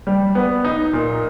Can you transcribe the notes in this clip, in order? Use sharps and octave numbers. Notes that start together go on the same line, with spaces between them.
G3
B3
D#4
A#2